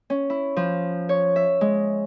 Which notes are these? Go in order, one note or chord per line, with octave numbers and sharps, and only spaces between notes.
C#4
E4
F3
C#5
E5
G#3